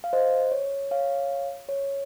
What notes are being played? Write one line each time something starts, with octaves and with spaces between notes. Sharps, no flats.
F5
C5 D#5
C#5
C#5 F5
C#5